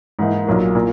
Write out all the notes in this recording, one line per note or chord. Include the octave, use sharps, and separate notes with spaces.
G#2 E3 A#3 D#4
B1 A#2 F#3 A#3
A#2 A#3